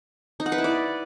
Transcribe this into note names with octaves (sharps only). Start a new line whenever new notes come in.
D#4
F#5
B4
E4
D5